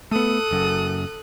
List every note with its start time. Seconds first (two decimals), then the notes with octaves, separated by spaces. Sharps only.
0.11 A3 B3 A4 D#6 F#6
0.51 F#1 F#2